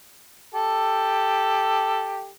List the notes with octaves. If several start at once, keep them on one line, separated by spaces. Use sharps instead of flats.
G4 A4